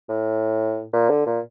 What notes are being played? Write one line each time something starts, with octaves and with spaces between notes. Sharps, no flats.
A2
A#2
D3
A#2